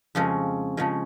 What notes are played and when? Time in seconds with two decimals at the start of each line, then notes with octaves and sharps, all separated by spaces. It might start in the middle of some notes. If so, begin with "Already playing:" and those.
0.15 F2 C#3 F3 G#3 C#4
0.77 C#3 F3 G#3 C#4